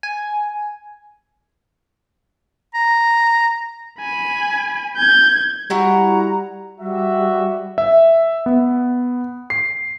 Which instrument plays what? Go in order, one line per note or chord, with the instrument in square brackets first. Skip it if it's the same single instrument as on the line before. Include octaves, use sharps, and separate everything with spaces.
[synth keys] G#5
[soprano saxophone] A#5
[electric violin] G#5 B5
G6 G#6
[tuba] G3 [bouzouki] E4 F#4 F#5 [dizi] A#5
[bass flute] G3 [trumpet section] F#4 E5
[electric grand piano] E5
B3
C7